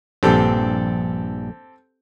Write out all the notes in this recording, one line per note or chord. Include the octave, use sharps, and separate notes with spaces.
A#1 G2 C4 G4 A4